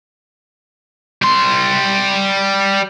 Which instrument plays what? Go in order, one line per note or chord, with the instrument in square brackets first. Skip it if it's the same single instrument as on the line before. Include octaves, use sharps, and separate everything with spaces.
[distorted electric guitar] G3 C6